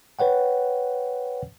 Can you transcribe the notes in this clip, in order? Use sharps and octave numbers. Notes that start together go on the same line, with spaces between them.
B4 C#5 F#5 G5